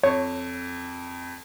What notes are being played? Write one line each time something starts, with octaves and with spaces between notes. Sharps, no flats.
F2 C#5